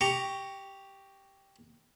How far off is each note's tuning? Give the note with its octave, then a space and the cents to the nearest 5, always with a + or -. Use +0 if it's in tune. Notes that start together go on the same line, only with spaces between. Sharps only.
G4 +0 A#5 +0 C#6 +10